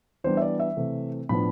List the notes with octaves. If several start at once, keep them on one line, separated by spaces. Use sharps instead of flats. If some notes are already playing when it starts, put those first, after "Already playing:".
E3 G3 B3 D4 C5
E5
D5
E5
C3 E3 A3 C4
A2 F3 B3 D4 B5